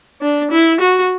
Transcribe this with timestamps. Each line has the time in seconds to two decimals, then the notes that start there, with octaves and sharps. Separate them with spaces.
0.22 D4
0.51 E4
0.81 F#4